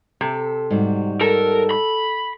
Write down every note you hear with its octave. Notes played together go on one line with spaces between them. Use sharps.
C3 A4
G#2 G3 F#4
A4 A#4
B5